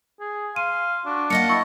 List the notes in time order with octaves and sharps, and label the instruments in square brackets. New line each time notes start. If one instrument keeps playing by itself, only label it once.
[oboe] G#4
[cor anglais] F5 [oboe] C6 [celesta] D#7
[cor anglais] D4 [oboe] F#4
[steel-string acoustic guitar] A#3 D#5 F#5 [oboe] A5 [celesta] C#7
[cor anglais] E4 [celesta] C#6